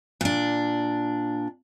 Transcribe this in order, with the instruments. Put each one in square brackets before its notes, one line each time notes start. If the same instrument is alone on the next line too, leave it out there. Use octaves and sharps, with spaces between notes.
[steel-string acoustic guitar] A#2 D4